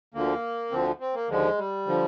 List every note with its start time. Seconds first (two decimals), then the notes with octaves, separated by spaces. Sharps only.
0.14 D2 D3 F3 A#3
0.71 D2 D3 F3 C4
1.00 C4
1.14 A#3
1.29 D#2 D3 F3 G#3
1.58 G3
1.86 D3 F3